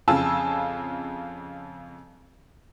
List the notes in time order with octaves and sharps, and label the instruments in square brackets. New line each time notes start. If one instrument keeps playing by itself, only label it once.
[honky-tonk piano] F2 C#3 F4 G#5 A5 E6